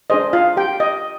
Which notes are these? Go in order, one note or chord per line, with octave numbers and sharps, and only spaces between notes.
D4 G#4 C5 D#5
F4 F5
G4 G5
D#5